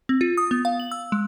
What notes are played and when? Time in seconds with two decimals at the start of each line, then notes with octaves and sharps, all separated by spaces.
0.09 C4
0.21 F4
0.37 D#6
0.51 B3
0.65 F5
0.80 F#7
0.91 E6
1.12 G#3